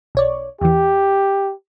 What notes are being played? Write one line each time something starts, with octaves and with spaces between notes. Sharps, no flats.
B1 C#5 D5
E2 E3 G4